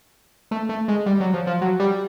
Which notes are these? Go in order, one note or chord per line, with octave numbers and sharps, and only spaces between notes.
A3
A3
G#3
G3
F#3
F3
F3
F#3
G3